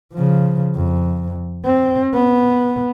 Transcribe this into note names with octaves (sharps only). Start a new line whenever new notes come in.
C#3 F3
F2
C4
B3